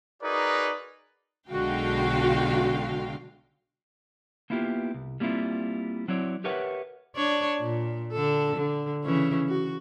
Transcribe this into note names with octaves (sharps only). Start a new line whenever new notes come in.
D#4 F#4 G#4 A#4 B4 D5
B1 D3 G#3 F#4 F5 G5
A#3 B3 E4 F4 G4
C2
G3 A#3 C4 E4 F4
F#3 C4 E4 C#5 D5
G4 A#4 B4 C#5 E5 F#5
D4 C#5 D5
A#2
D3 A4
D3
C#3 E3 C#4
F#4